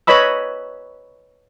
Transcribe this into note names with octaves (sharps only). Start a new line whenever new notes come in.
B4 C#5 D#5 B5 E6